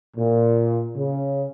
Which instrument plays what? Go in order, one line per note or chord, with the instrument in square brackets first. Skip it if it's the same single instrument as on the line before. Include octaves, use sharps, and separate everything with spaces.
[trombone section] A#2
C#3